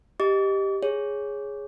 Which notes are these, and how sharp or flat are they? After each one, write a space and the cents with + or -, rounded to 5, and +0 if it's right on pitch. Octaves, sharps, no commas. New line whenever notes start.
G4 +0 D#5 +0 D6 -45
G#4 -5 C#5 +0